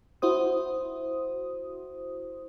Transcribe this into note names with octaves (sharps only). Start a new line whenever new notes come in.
E4 F#4 C5 D#6